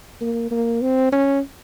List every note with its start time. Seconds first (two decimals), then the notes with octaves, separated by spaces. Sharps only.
0.21 A#3
0.51 A#3
0.82 C4
1.13 C#4